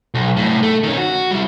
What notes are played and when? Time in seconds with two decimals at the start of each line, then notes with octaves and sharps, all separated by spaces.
0.14 B1
0.37 C2 A2
0.63 A3
0.84 D#3 C#4
0.98 F#4
1.31 G3 E4